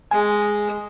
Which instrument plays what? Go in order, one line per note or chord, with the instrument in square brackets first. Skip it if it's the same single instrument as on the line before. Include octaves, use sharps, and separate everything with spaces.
[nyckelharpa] G#3 [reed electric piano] G#5